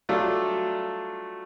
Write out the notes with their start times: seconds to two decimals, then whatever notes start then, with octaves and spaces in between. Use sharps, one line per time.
0.09 F#3 G3 A3 D4 F4 A4